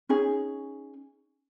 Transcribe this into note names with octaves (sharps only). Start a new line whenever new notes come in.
C#4 D#4 G#4